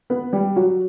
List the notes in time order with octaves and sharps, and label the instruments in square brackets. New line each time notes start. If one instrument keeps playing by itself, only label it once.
[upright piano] B3 B4
G3 G4
F#3 F#4